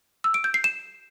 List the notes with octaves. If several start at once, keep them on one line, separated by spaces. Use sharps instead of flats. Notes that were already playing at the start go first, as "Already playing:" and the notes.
E6
D7
G6
C7
E7